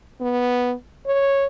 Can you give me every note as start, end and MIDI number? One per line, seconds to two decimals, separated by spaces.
0.21 0.74 59
1.06 1.47 73